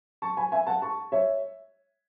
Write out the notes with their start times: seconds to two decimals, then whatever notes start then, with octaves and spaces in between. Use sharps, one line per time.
0.22 A5 C#6
0.37 G#5 B5
0.52 E5 G#5
0.67 F#5 A5
0.82 A5 C#6
1.12 C#5 E5